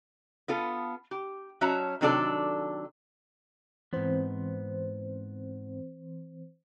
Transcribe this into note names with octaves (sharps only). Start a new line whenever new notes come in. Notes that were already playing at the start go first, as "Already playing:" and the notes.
B3 F4 A4
G4
F#3 C#4 F#4 E5 A5 A#5
C3 D#3 F#3 D4 A4 D5
G#2 E3 B3 C4 C5